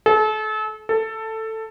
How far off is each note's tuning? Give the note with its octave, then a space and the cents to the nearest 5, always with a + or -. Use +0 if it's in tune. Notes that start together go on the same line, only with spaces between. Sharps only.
A4 -35
A4 +10